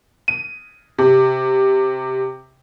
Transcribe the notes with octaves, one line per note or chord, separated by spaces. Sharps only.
D#7
C3